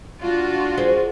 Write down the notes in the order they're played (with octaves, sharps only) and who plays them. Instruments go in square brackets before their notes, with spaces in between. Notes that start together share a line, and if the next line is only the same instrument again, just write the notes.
[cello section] D4 F4 F#4
[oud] G#3 G#4 C5